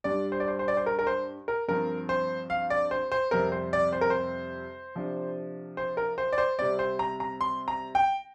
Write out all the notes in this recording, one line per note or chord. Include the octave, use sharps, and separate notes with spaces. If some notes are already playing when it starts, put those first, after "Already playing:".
G2 G3 D4 D5
C5
D5
C5
C5
D5
C5
A#4
A#4
C5
A#4
G2 F3 C4 A#4
C5
F5
D5
C5
C5
F2 C3 G3 C4 A#4
C5
D5
C5
A#4
C5
C3 F3 D4
C5
A#4
C5
D5
C5
C3 G3 C4 D5
C5
A#5
A#5
C6
A#5
G5